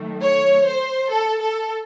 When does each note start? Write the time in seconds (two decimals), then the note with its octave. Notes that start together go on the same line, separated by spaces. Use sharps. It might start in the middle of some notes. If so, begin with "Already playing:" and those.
Already playing: D#3 F#3 A3
0.21 C#5
0.66 C5
1.10 A4
1.40 A4